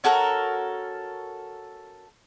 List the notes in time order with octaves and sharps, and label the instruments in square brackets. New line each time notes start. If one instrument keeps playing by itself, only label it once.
[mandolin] C#4 F#4 A4 A#4